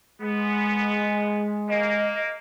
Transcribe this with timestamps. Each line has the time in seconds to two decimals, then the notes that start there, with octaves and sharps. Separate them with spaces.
0.21 G#3 B3
1.69 A#3 D#5